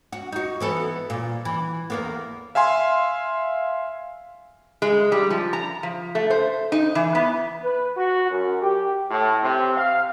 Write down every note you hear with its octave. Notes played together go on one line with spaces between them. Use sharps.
F#4
D#4 F#4
E3 B3 A4
A#2
E3
E2 A#3 B3
E5 F5 G#5 C6
G#3
G3
F3
A#5
F3
A3
C5
D#4
E3
B3
B4
F#4
F#2
G4
A2
C3
F5